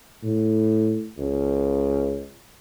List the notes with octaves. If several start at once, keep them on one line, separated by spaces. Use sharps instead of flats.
A2
C#2